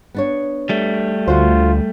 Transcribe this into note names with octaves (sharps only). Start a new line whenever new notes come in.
B3 D4 C#5
G3 A3
D2 F4 F#4 C5